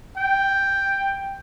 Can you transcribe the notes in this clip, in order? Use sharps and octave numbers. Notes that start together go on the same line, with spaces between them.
G5